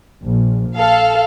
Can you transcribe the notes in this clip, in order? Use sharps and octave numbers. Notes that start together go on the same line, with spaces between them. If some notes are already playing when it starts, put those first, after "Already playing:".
A#1
A4 F5